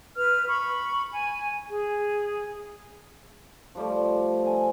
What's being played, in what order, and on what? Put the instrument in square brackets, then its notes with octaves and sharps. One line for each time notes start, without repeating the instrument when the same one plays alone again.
[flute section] B4 F6
B5 C#6
G#5
G#4
[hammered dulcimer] F3 G3 A3
A4 G#5